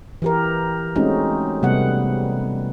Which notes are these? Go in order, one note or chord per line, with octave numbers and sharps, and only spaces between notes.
E3 G4 A#4
G#3 A3 C4 C#4 D#4 F#4
C3 G3 A3 B3 F#5